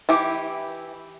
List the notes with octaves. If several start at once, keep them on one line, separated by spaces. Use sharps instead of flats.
E3 E4 G4